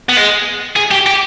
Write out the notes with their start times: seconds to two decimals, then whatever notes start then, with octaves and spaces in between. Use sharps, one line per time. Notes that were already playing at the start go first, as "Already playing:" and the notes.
0.09 B3
0.17 G#3
0.76 G#4
0.91 G4
1.06 G4